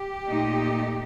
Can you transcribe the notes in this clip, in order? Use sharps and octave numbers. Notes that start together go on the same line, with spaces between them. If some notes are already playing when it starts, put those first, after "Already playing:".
Already playing: G4
A#2 A3 D#4